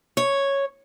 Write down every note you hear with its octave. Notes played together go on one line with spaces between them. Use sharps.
C#5